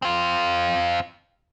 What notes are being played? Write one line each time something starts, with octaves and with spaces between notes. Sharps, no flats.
C4 F4